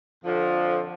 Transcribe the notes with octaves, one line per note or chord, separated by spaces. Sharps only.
F2 D3 F3